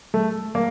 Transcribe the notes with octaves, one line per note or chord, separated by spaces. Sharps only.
A3
A#3